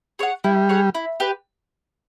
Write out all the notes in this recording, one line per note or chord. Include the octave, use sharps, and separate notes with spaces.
G#4 C#5 F#5
G3 E4
G#4 C#5 F#5
E4
G4 B4